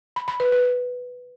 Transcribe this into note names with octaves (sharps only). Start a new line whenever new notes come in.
B5
B5
B4
B4